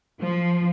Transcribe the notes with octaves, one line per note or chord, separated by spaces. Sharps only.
F3